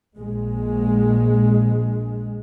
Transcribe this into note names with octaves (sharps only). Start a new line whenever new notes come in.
A#1 G#3